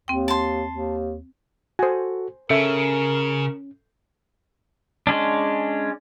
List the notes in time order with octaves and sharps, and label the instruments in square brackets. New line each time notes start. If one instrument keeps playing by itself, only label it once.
[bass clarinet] D#2 [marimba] C4 G5
[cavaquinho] A5 C6
[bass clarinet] D#2
[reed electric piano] F#4 A4 [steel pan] C5 G#5
[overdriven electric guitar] C#3 [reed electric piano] C#4 [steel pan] A4 E5 [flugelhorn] A#4
[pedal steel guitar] G#3 C#4 D4